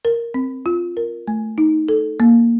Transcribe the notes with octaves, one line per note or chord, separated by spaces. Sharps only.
A#4
C4
F4
A#4
A3
D#4
A4
A#3